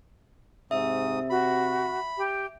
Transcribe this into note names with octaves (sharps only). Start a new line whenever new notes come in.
G#2 C3 E5 D#6
F#4 B5
G4 G5